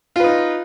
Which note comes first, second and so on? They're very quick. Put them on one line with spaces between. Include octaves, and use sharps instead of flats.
F4 B4 D#4